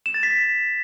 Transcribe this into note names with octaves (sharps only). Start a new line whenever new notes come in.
E7
A6
B6